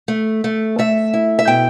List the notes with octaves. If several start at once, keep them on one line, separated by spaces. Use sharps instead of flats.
A3
A3
A3 E5
E4
E5
B2 G5